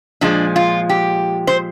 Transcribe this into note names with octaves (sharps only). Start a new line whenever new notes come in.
A#2 F3 G#3 D4
F4
G4
C5